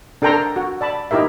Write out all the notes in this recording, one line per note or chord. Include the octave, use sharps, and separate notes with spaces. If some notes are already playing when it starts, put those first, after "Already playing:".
D4 A4 A#4 G5 A#5 C6
F#4
D5 A5 B5
D#4 E4 G4 A#4 E5